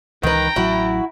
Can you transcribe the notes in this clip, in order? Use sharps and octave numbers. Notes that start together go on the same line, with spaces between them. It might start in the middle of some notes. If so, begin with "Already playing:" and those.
C#2 D#3 E3 B4 G5 A#5
A1 F#3 E4 F#4